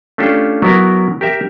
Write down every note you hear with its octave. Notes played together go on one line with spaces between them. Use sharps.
A3 C#4 D4 F4 G4 A4
F#3 B3 E4 A#4
G4 A#4 E5